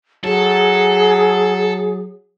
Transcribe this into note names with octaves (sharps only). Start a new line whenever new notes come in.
F#3 G#4 A4